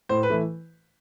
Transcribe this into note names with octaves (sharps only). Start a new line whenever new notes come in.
A2 C5
B4
E3 A3 E4